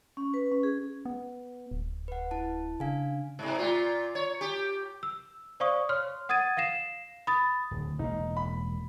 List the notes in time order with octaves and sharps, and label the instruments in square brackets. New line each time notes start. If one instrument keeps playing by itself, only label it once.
[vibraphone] C#4
B4
C#4
G#4
[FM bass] B3
D1
[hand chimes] B4 F#5
E4 A5
[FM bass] C#3 [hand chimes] D4 F5 G#5
[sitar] G#2 C3
A#2 F4
C#5
G4
[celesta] E6
C5 D5 F5 C#6 D#6
C#5 C6 F6
F#5 D#6 G#6 A6 D#7
F5 A#6 C7 E7
B5 D#6 A6
[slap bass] D1
[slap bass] E1 A#3 [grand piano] D#4
[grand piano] B5